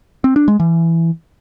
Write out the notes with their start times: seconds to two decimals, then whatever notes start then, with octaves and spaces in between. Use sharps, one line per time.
0.24 C4
0.36 D4
0.48 G#3
0.60 E3